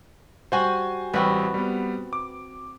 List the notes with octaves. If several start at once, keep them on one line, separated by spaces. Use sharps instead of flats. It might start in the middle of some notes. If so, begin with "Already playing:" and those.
G3 F#4 C5 G#5
A1 G3 C4 F#4 B4
G3 B3
D6